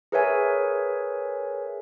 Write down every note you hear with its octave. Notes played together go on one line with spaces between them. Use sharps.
G#4 A#4 B4 C#5 E5 G#5